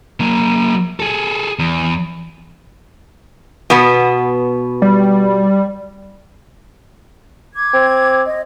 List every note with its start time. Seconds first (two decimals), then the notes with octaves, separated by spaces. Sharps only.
0.20 F#3 A#3
1.00 G#4 A4
1.59 E2
3.70 B2 B3
4.82 G3
7.54 D6 G#6
7.74 C4
8.26 D#5